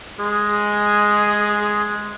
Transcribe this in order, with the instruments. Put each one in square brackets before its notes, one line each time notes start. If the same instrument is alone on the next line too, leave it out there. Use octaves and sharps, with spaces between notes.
[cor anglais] G#3 [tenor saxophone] G#4